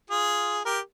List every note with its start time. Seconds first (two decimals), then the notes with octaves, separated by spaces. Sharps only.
0.10 F4 G#4
0.65 G4 A#4